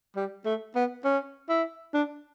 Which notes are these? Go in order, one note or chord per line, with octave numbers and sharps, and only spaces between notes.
G3
A3
B3
C#4
E4
D4